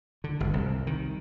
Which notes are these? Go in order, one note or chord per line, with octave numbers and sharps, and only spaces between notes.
D3
G1
C2
D#3